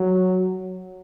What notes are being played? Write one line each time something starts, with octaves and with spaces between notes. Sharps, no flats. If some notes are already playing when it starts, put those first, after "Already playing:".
Already playing: F#3